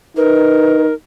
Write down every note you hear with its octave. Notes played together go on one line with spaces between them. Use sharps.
D#4 A#4 B4